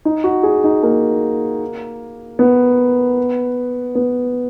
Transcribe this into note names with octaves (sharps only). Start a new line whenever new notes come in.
D#4
F#4
G#4
D#4
A#3
B3
B3